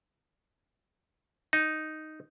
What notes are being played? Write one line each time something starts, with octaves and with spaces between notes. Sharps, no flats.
D#4